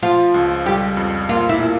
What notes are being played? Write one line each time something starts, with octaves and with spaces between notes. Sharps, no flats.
F3 F4
C#2
G3 G4
F2
A#3 F4
E4
A#2